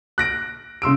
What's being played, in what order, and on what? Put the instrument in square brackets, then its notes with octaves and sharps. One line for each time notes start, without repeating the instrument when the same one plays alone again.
[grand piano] F#6 A#6 D7
C#3 C6 E6 D7